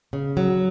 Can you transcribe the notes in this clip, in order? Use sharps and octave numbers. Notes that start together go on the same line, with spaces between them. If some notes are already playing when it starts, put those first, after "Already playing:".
C#3
F#3